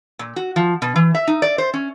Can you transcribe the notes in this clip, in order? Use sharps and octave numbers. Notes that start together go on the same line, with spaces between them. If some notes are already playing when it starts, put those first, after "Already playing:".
A#2
F#4
F3
B2
E3
E5
D#4
D5
C5
C#4